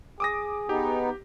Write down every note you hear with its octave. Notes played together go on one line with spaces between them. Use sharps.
G#4 D6 D#6 A#6
B3 D#4 G4